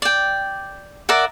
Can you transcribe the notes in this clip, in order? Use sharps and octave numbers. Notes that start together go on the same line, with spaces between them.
D5 G5
A#4 D5 E5 F#5